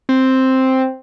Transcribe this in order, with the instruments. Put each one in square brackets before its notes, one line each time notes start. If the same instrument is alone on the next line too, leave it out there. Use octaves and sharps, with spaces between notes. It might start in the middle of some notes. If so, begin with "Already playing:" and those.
[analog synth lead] C4